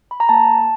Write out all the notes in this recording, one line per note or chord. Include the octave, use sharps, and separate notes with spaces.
B5
A#5
A#3 A5